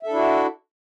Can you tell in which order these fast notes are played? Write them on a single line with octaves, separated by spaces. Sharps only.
E5 A4 D4 E4 F#4